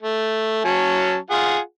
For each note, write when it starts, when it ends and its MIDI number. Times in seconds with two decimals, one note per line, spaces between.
0.03 0.62 57
0.65 1.16 54
0.65 1.16 61
0.65 1.16 81
1.30 1.58 65
1.30 1.58 68
1.30 1.58 78